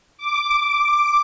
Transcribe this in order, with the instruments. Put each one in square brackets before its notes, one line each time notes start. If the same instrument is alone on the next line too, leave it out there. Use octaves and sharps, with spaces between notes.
[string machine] D6